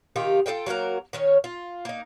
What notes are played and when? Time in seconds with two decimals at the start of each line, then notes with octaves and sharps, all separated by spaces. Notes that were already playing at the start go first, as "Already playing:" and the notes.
0.16 C3 D#3 F4 G4
0.46 F4 A4 D#5 G5
0.66 F#3 A#3 F#4 A#4
1.13 D#3 C#4 C#5
1.44 F4
1.85 A#3 D#4